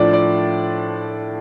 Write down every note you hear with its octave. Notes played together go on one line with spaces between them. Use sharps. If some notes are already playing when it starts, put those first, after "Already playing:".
Already playing: A2 F3 D4 D5
D5